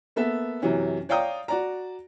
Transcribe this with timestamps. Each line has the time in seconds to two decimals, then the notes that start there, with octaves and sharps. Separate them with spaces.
0.16 A#3 B3 A4 E5
0.62 F#2 C3 E3 C#4
1.09 C#5 D5 F5 G5 A#5 D#6
1.48 F#4 D5 A#5